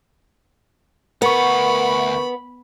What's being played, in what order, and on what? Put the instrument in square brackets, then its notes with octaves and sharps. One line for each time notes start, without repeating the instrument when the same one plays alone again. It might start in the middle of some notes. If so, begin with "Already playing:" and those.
[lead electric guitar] D2 F#5 [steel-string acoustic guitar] B3 [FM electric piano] A#4 C#6 [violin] B5